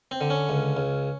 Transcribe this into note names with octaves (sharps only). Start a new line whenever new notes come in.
C4
D3
C#4
C#2
C#2